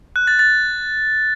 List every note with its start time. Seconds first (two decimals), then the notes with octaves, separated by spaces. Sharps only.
0.16 F#6
0.27 A6
0.39 A6